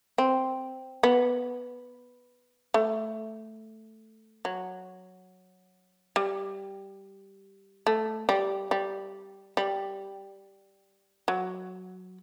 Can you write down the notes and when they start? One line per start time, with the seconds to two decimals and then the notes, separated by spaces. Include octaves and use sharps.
0.18 C4
1.03 B3
2.74 A3
4.45 F#3
6.16 G3
7.87 A3
8.29 G3
8.71 G3
9.57 G3
11.28 F#3